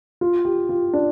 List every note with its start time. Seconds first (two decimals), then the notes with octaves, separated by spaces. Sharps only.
0.21 F4
0.45 G4
0.69 F4
0.93 D4